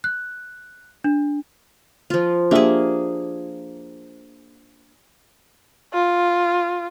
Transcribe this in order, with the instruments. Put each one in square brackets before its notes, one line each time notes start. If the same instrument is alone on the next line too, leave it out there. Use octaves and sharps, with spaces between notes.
[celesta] F#6
D4
[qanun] F3 F4
[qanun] A#3 G#4 [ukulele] D4 G4 E5
[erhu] F4